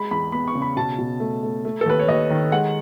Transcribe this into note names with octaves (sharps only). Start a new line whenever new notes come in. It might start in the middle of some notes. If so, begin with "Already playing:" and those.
Already playing: G#3 B5
E2 B5
B3 B5
C#6
C#3
B5
B2 A5
B2
A3
A3
A3
A4
D#2 B4
C#5
D#2 D#5
D#3
G#3 F#5